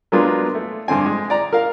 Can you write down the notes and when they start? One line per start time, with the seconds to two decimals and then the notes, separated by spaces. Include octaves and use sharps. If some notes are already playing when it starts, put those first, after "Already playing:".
0.12 F#3 G#3 A#3 B3 D4 F4
0.55 A3
0.88 G2 D3 C4 G#5
1.06 G#3
1.30 D5 A#5
1.53 A#4 F5